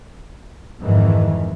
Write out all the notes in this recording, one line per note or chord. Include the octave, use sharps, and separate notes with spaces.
F2 G#2 D#3 E3